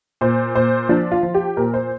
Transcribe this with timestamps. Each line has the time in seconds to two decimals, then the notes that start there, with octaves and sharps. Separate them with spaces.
0.21 A#2 C5
0.55 A#2 C5
0.89 F3 D4
1.11 F4
1.23 F3
1.34 G4
1.57 A#2 A#4
1.74 C5